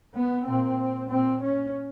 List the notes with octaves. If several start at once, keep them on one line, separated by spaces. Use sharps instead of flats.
B3
A#2 C4
A#2 C4
C#4